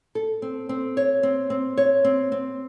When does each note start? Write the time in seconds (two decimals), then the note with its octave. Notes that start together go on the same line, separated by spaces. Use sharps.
0.15 A4
0.42 C4
0.69 C4
0.97 C#5
1.23 C4
1.50 C4
1.78 C#5
2.04 C4
2.32 C4